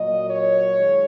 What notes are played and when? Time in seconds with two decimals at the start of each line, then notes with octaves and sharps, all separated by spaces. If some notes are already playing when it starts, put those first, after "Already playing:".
Already playing: A#2 F#3 D#5
0.30 C#5
0.74 D#3 G#3